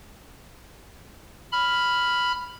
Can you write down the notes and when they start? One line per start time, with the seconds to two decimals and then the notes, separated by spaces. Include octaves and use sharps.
1.52 B5 F6